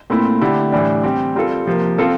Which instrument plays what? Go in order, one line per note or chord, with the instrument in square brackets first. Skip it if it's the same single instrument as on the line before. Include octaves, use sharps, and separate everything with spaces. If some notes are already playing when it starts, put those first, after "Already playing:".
[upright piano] A#2 A3 C4 E4
D3 A3 E4 G4
A2 E3 G3 D4
G3 C4 G4
G3 C4 F4 A4
C3 F3 A#3
F3 C4 F4 A4